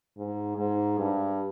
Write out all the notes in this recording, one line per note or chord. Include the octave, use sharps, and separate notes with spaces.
G#2
G#2
G2